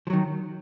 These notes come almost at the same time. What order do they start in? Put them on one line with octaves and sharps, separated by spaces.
F3 F#3 D#3